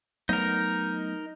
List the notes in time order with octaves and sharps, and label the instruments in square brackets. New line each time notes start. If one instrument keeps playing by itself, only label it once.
[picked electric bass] F#3 A3 B3 [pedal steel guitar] D#4 A#4